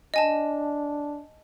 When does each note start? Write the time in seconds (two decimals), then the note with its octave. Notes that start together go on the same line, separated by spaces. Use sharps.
0.14 D4 D#5 G#5 A5